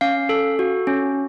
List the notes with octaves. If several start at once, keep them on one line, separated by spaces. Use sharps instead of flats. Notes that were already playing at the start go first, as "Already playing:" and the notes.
C#4 F5
A4
F#4
C#4